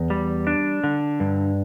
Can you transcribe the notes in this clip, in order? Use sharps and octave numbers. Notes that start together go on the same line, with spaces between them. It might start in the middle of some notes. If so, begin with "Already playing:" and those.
Already playing: E2
G3
D4
D3
G2